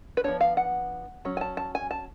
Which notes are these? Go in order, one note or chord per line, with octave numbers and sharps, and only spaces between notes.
B4
F3 B3 D4 C#5
F5
F#5
F#3 C#4
G#5
A5
A5
G#5
A5